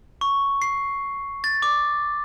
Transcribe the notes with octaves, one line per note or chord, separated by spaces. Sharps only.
C#6
C7
A6
D6